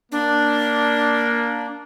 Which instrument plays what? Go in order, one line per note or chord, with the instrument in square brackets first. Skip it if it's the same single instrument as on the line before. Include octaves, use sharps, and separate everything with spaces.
[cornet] A#3 [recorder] D4